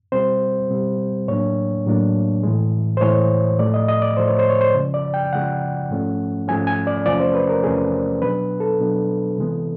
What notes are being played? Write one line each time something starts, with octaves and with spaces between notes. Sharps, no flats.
B2 G3 C4 C5
B2 G3 C4
A2 F#3 A#3 D4 C#5
A2 F#3 A#3 D4
A2 E3 G#3
C5
A2 E3 G#3 C#5
A2 F3 A3 D5
D#5
D#5
D5
A2 F3 A3 C5
C#5
C5
C#5
C5
C#3 F3 G#3
D5
G5
C#3 F3 G#3 F#5
G#2 F3 A3 C#4
G#2 F3 A3 C#4 G#5
G#5
D5
E2 C3 F3 A3 C#4 D5
C5
B4
A#4
E2 C3 F3 A3 C#4 G#4
B2 F#3 B3 D4 B4
A4
B2 F#3 B3 D4
C3 E3 G#3 B3